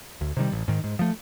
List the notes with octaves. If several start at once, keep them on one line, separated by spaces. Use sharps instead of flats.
D2
C3 D#3 G3
A1
G#2 D#3
G#2
F3 A3